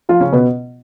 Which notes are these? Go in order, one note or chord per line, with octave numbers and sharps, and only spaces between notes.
F3 F4
C#3 C#4
B2 B3